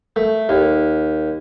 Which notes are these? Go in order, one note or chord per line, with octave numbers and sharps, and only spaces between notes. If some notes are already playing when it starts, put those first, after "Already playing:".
A3
D#2